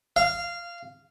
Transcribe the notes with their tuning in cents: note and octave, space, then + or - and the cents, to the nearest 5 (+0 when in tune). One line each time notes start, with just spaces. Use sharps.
F5 -15